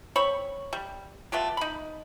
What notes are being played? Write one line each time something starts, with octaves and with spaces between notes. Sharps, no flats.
C4 C#5 B5 C#6
G3
A3 B3 F4 G4
D#4 B5